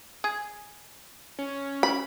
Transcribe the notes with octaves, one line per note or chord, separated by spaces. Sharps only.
G#4
C#4
B5